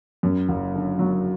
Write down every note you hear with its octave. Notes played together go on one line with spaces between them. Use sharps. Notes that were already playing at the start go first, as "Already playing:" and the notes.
F#2
F#1
D3
F#3